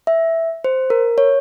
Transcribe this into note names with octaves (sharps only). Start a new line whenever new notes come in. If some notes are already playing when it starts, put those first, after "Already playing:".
E5
C5
A#4
C#5